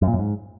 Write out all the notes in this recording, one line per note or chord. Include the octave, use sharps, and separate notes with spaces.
F#2
A#2
F#2
G#2